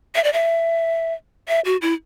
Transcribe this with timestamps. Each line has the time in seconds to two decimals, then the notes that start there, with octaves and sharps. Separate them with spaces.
0.15 E5
0.24 D5
0.33 E5
1.48 E5
1.65 F#4
1.82 E4